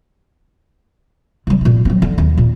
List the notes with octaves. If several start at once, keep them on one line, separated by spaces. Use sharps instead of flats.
C3 G3
A#2 G#3
F#3 C4
D3
D#2
A#2